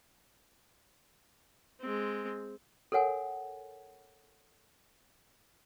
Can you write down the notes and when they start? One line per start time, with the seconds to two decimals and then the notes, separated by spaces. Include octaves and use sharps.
1.80 G#3 C4
2.92 A4 A#4 C#5 F#5 G#5